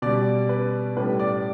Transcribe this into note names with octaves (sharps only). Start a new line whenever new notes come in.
B2 G3 D5
B4
A2 G3 B4
D5